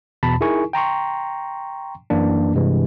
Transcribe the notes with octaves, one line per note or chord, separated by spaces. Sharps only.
E2 B2 A5 B5
D#4 E4 G#4 A#4 G#5 C#6
G5 A#5 C6 C#6
F#2 E3 A#3 D4
G2 C3 E3 G#3